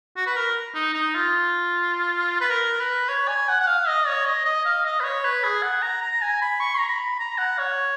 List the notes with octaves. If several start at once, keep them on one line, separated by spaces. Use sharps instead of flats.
F#4
B4
A#4
D#4
D#4
F4
B4
A#4
B4
C#5
G#5
F#5
F#5
F5
D#5
C#5
D#5
D#5
F5
D#5
B4
C#5
B4
G#4
F#5
A#5
A#5
G#5
B5
C#6
A#5
B5
A#5
F#5
C#5